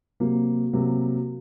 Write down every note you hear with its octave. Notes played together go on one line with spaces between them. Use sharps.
C3 F#3 A#3
C3 F#3 A#3